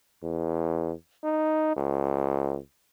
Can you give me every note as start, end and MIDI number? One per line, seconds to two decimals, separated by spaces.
0.23 0.92 40
1.24 1.74 63
1.76 2.58 37